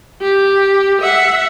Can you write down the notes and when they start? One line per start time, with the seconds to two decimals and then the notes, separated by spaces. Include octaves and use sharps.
0.22 G4
1.01 E5 F#5